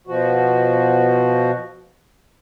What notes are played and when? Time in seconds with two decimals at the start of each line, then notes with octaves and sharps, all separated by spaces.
0.07 B2 F3 F#4